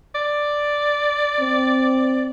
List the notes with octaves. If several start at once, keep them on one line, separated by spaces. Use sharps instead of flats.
D5
C4